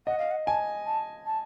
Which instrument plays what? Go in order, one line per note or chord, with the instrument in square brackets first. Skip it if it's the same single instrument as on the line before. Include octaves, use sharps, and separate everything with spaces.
[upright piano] D#5 [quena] F#5
[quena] F5
F#5
[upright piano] G#5 [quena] A5
[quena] A5
A5